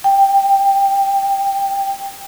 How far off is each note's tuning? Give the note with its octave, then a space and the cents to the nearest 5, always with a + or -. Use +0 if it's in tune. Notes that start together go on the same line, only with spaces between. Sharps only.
G5 +10